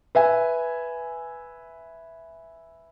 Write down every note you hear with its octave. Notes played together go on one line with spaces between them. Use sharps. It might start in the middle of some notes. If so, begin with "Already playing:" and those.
B4 E5 G#5